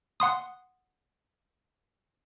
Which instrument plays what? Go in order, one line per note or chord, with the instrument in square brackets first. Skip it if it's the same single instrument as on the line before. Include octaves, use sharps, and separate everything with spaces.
[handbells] F#5 C6 D#6